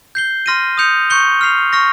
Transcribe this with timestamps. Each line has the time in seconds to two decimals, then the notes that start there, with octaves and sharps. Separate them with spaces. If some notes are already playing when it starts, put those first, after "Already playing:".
0.15 G6 C7 G7
0.46 C6 F6 A#6 D#7
0.77 D#6 G6 C#7 F7
1.10 C#6 G6 C#7 G7
1.41 F6 C7 F7
1.73 C#6 F6 A#6